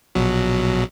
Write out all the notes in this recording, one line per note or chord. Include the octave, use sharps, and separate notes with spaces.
A#1 B2 F#3